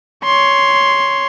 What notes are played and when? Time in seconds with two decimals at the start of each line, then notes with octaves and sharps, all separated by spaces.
0.24 C#5 C6